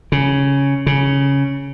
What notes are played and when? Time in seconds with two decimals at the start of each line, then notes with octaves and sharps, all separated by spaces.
0.12 C#3
0.86 C#3